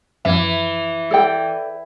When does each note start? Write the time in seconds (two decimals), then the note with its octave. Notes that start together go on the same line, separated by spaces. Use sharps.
0.25 F#2 E3 F3 E5
1.11 A4 D5 G5